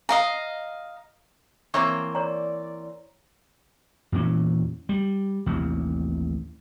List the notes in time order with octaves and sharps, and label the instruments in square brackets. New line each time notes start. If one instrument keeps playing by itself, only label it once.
[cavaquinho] D#5 F5 A#5
[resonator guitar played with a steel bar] E3 A#3 C4 [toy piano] C#5 C#6 D6
[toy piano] C#5 A#5 [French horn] D5
[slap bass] E2 A#2 E3 C#4
G3
A1 D#2 C3